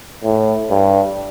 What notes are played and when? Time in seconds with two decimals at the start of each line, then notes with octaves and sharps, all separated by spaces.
0.23 A2
0.70 G2